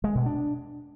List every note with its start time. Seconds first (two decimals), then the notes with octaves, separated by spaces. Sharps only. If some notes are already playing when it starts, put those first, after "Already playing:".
0.04 G#3
0.15 B2
0.26 D4